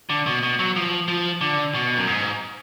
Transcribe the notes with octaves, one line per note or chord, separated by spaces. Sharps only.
D3
B2
B2
F#3
F3
F3
D3
B2
F#2
G#2